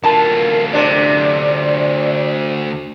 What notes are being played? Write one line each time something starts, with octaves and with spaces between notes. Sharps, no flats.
D2 F4 A#4 A5
C3 D4 D5